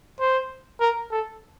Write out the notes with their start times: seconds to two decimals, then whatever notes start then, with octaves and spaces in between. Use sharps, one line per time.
0.20 C5
0.80 A#4
1.11 A4